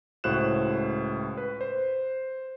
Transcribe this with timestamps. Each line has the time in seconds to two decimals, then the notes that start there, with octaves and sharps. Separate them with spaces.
0.24 C#2 A2 F#4 C5 F#6 E7
1.37 B4
1.61 C5